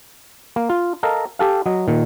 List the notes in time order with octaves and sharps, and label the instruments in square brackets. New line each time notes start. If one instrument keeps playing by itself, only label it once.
[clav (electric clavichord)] A#3
F4
A4 A#4 D#5 F5 A#5
G4 A4 F5
F#3 D#5
A#2 D#3